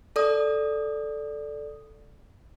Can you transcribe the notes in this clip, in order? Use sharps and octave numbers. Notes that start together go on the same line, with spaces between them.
A4 D5 D#6